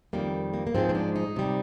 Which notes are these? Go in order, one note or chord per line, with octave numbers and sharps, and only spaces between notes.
F2 D#3 G3 A#3
A#3
A#3
G#2 F3 G#3 C4
C4
D4
D#4
C3 G3